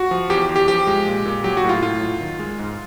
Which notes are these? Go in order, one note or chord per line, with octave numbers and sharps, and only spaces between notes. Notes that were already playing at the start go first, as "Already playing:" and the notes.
Already playing: F#4
F3
E2 G4
E2
G4
F3 G4
G#3
A#2
A#2
F#3 G4
F#4
A2
F4
A2 F4
F#3
D#3
G#3
G#2